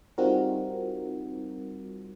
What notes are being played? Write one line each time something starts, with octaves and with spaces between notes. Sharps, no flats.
G3 C4 D#4 F4 F#4 A#4